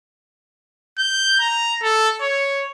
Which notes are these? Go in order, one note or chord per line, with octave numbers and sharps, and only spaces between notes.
G6
A#5
A4
C#5